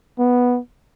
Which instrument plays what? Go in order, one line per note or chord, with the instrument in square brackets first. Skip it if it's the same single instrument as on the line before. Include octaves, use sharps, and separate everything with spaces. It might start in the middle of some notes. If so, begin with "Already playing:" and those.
[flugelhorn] B3